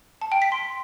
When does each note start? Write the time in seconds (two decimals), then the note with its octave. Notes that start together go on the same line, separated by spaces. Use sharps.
0.21 A5
0.32 G5
0.42 B6
0.52 C6